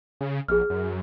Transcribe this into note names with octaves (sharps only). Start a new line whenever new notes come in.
C#3
A#1 G#4 F6
F#2